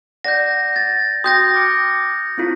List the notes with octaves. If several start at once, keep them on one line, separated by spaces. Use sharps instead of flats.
D5 F#5 G6 A#6
A6
F#4 G5 C6 D#6 G6 A#6
D6 F6 C#7
C4 E4 F4